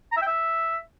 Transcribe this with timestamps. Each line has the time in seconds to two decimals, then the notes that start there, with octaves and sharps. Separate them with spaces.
0.12 A#5
0.17 E5
0.22 G5
0.27 E5